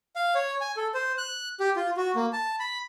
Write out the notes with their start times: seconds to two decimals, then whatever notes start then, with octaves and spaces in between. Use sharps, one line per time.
0.16 F5
0.35 C#5
0.61 G#5
0.77 A4
0.94 C5
1.18 F#6
1.60 G4
1.76 F4
1.97 F#4
2.15 A#3
2.33 A5
2.59 B5